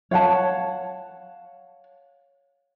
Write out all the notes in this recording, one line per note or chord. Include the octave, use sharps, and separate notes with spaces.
C#5 F5 F#5 A5